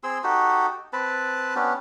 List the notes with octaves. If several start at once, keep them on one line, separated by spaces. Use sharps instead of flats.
C4 G#4 C6 E6
D#4 F#4 G4 A4
C4 B4 A5 B5
B3 C#4 D4 G4